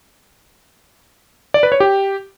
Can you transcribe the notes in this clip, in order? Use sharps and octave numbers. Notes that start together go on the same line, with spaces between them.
D5
B4
C#5
G4